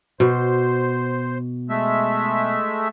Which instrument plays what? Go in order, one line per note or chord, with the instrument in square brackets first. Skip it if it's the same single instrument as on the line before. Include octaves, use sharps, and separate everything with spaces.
[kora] B2 [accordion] C5
[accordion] G#3 A3 E5